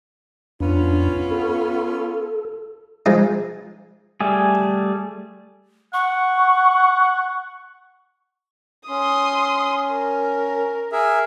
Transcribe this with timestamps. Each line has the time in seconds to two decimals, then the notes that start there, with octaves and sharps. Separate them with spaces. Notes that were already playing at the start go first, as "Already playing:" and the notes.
0.60 F2 B3 C#4 D4 F4
1.31 A4
3.06 F3 G#3 D#4
4.21 G3 A3 G#4
5.94 F#5 C#6
8.89 C#4 C6 D#6
9.90 A#4
10.92 G#4 A#4 E5